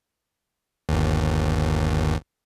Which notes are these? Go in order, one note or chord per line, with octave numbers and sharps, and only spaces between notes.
G1 D#2